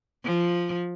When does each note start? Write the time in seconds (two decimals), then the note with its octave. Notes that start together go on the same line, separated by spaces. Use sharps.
0.24 F3